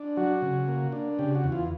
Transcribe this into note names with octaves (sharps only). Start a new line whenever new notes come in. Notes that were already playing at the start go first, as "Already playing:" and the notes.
Already playing: D4
F#3 F#4
C#3
A#3
D4
C#3 G4
F#4
E2
F4